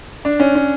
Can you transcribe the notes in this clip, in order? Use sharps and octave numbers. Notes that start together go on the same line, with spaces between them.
D4
C#4
C#4